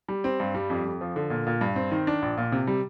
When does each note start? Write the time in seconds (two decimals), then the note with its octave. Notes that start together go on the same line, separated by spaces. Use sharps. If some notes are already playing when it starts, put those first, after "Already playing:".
0.08 G3
0.24 C4
0.40 G2
0.54 G3
0.70 F2
0.85 F2
1.01 F3
1.16 D3
1.30 A#2
1.47 A#2
1.61 G2
1.76 C4
1.91 D#3
2.07 D4
2.22 A#1
2.37 A#2
2.52 C3
2.67 G3